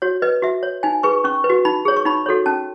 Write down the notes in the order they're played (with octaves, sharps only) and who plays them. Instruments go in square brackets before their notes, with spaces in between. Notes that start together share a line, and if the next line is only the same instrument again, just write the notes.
[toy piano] F#4 C#5
B4 D#5
F#4 E5
C#5
D#4 G#5
G#4 B4 C#6
C#4 C#6
B4
F#4
D#4 B5
G#4 C#5
C#6
D#4 B5
F#4 A4 C#5
C#4 A5